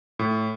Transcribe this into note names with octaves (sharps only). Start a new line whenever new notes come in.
A2